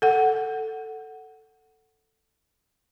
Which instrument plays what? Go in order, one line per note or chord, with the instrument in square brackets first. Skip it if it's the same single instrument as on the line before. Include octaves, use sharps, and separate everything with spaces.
[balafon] A4 F#5